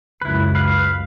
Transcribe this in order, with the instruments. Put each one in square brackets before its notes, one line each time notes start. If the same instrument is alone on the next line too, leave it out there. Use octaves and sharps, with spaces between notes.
[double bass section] C#2 F#2 [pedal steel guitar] E4 B4
[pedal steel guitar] B4 F5